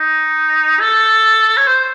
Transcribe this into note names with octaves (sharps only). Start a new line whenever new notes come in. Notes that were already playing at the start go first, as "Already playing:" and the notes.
Already playing: D#4
A4
C#5
C5